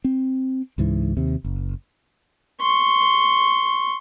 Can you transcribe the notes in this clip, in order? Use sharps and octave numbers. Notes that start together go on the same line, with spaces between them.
C4
C#2 G#2 E3
D#2 C3
F#1
C6 C#6